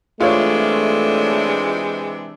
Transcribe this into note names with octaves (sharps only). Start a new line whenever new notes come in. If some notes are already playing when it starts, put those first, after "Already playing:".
C3 E3 G#3 A3 D4 F4 C#5